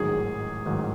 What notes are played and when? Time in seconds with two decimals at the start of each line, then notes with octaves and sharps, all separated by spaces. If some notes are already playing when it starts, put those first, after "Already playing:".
Already playing: A1 G#2 D#3 F#3 G#4
0.65 A1 G#2 D#3 F#3